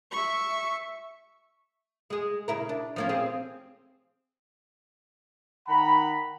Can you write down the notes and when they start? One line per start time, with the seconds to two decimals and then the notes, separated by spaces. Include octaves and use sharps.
0.11 E5 C#6
2.10 G#3 G#4
2.48 C#3 E4 A#4
2.69 D4
2.96 F3 A#3 C#4
3.09 C4 G4 G#4
5.67 D#3 F#5 A#5 B5